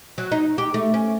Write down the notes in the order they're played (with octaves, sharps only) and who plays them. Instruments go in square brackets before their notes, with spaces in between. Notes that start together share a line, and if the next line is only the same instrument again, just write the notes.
[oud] F#3
D#4
G4
A3
C#4